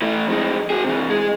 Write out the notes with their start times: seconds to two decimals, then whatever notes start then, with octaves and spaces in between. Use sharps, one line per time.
0.02 E3 A3
0.28 F2 G#3
0.70 F#4 G#4
0.85 C3 E3
1.10 G#3 G#4